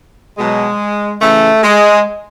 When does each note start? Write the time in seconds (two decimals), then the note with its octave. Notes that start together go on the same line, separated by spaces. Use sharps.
0.38 B2 F#3 G#3
1.21 C#3 E3 A3
1.63 G#3